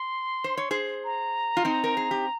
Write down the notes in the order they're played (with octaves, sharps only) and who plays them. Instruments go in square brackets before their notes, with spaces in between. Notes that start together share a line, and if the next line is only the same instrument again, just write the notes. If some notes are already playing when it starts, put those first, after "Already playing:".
Already playing: [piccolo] C6
[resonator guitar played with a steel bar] C5
C#5
G#4 C5
[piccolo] A#5
[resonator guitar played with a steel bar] F4
C4 D#4
A#4
G#4
G4